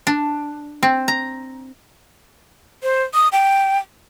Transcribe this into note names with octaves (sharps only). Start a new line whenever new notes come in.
D4
C4
A#5
C5
D#6
G5